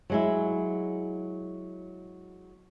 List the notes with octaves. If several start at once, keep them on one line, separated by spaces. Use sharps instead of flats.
F#3 G#3 E4